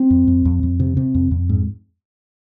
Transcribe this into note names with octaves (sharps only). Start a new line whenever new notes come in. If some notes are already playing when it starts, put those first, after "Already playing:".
Already playing: C4
F2
F2
F2
F2
C3
C3
F2
F2
G#2